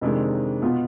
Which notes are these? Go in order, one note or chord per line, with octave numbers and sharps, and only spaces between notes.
F2 C3 D#3 G#3 D4
B2 B3 F4